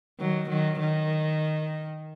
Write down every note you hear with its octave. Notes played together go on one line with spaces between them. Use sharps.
D#3 F#3
D#3 F#3
D#3